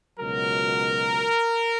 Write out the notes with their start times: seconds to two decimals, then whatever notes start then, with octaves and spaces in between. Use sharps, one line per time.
0.19 C#2 B2 F#3 A#4